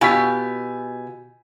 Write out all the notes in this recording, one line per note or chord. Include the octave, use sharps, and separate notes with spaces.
B2 F4 G4 G#5 E6 B6